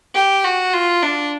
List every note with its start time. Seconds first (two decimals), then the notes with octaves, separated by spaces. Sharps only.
0.14 G4
0.44 F#4
0.73 F4
1.03 D4